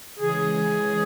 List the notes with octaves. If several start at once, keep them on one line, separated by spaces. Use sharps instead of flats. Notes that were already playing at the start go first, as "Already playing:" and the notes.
C#3 E3 G#3 C#4 G#4